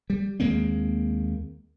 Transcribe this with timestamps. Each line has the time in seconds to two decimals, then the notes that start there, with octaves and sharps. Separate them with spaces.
0.10 G3
0.40 D#2 G#3 A#3 C4